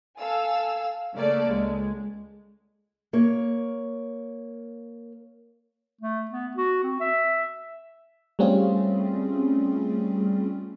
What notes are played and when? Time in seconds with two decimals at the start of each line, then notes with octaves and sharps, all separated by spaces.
0.19 A4 F5 G#5 E6
1.15 C#3 A3 A#3 A4 D5
1.47 C#2 G#3
3.13 A#3 C#5
6.01 A3
6.31 B3
6.57 F#4
6.83 C4
7.00 E5
8.39 G3 A3 C4 C#4 F4 G#4